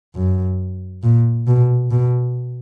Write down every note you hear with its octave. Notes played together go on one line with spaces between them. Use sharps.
F#2
A#2
B2
B2